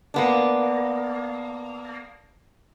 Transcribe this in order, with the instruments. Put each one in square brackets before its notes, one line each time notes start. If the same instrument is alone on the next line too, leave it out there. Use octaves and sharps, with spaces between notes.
[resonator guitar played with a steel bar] A#3 B3 D4